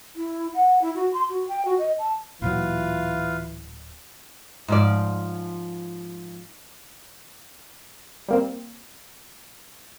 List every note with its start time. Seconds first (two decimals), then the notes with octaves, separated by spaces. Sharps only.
0.16 E4
0.54 F#5
0.82 E4
0.95 F#4
1.13 C6
1.29 F#4
1.48 G5
1.65 F#4
1.78 D#5
1.99 A5
2.42 D1 A#2 E3 F#3 F4 B4 F5
4.68 G#2 F3 D5
8.29 G3 A#3 C4